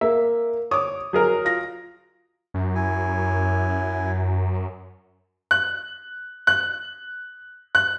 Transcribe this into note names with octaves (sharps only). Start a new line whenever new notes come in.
A#3 E5
C#5 D6 D#6
F#3 G#4 A#4
F4 A#6
F#2
E4 G#5
F#6
F#6
F#6